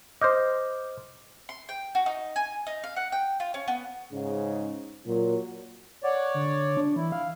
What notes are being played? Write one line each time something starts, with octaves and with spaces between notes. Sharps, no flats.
C5 D#5 D6 F6 G6
C6
G5
F#4
D#4
G#5
D#4
F5
F#5
G5
F4
C#4
B3
G#2 C#3
A#2 F#3
C#5 D5 F#5
D3
D4
E3 E4
F5